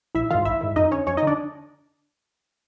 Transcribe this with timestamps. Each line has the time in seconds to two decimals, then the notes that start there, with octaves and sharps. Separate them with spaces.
0.15 A#1 E4 E5
0.30 G#2 D#3 F4 F5
0.45 A#1 E4 E5
0.61 G#2 D#3
0.76 F2 D#4 D#5
0.91 D3 C#4 C#5
1.07 F2 C#4 C#5
1.17 D#4 D#5
1.23 D3 D4 D5